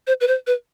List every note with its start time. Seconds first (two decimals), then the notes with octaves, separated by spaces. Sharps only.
0.07 C5
0.21 B4
0.27 C5
0.47 B4